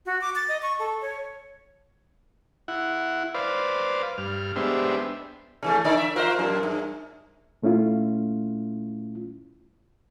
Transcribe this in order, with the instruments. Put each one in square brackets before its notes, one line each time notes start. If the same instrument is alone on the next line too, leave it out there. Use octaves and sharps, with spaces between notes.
[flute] F#4
D6
A6
D#5
C#6
A4
C#5
[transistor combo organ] E4 F#5
B4 C5 D5 F5
G2 F6
G#3 B3 D4 G4 C5 E5
[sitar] C3 E3 A3
D3 D#4 D5
E5
F4 A#4 C5
F#2 A#2
G2
[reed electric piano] A#2 A3 C#4 E4 F4